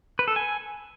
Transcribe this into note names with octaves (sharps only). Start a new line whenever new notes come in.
B4
A4
G#5